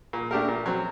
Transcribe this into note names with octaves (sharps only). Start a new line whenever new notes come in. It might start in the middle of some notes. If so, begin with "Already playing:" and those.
A#2
A3 D4 G4 A#4
A#2
F#3 C4